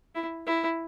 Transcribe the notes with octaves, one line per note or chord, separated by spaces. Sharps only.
E4
E4